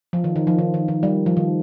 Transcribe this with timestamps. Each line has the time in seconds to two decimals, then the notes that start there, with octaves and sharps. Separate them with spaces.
0.13 F3
0.24 D#3
0.36 D#3
0.47 F3
0.59 D#3
0.74 D#3
0.88 D#3
1.03 G3
1.26 F3
1.37 D#3